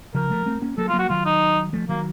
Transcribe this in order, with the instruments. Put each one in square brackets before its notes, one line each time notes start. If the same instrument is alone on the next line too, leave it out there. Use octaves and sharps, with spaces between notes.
[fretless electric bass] C#3 F3 [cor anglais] A#4
[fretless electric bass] F3 A3
A3 C4
A#3 C#4
[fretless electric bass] F#3 A#3 [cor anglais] A4
[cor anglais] F4
[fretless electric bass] F#3 A#3
[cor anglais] F#4
[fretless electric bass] D#3 F#3 [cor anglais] F4
[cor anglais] D#4
[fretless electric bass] F3 A3
[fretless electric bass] D#3 F#3 [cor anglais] A#3